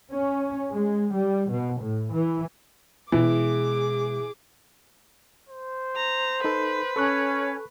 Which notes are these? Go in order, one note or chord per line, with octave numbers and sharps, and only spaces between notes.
C#4
G#3
G3
B2
A2
E3
B2 E3 G#3 G#4 D6
C5
A#5
D#4 A4 B4
C#4 A4 C#5 C#6 F#6